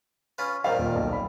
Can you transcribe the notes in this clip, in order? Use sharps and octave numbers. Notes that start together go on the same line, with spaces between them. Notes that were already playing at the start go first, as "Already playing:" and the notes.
C#4 F4 B4
A#2 D#3 G3 A#4 C5 F5
D#1
B1
B5